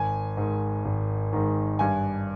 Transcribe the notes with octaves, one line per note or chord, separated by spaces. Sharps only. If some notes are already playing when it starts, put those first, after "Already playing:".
Already playing: G#1 G#5
G#2 D#3
G#1
G#2 D#3
G2 G#5